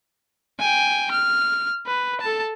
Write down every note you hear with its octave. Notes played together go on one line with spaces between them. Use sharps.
G5 G#5
F6
B4
A4 A5